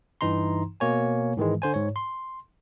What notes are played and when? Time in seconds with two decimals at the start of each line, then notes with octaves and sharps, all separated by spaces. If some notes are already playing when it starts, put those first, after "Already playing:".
0.21 G2 E3 D#4 A#5 C6
0.80 B2 A#3 C#5 G#5
1.37 G#2 D#3 E3 G#3
1.62 D3 C5 G#5
1.74 G#2 C#5
1.96 C6